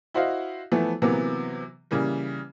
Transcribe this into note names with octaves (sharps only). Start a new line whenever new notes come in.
E4 F#4 C5 D#5 F5
E3 F3 A3 B3
C3 E3 F#3 A#3 B3
C#3 E3 G3 A#3